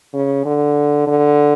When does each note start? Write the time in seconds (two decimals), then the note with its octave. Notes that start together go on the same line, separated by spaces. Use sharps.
0.14 C#3
0.45 D3
1.07 D3